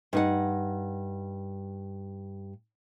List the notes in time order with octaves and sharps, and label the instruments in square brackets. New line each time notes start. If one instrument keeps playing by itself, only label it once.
[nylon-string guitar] G2 D#4 F#5